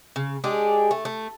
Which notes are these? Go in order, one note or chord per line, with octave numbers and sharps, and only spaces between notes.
C#3
G#3 D4 G4 G#4
A3
A3